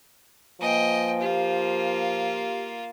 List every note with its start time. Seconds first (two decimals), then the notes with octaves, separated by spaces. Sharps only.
0.61 F3 A#3 B4 D#5 G5 G#5
1.21 A#3 F4 G4